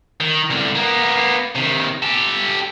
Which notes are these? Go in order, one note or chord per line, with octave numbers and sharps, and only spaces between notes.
D#3
C2 D3
A#3 B3
C3 D#3
G4 A4